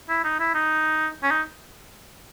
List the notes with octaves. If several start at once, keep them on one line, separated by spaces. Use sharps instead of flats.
E4
D#4
E4
D#4
C#4
D#4